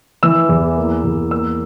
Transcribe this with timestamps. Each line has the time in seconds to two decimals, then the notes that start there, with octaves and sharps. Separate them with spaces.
0.23 E3 E6
0.49 E2
0.77 A#3
1.04 E2
1.31 A#3 E6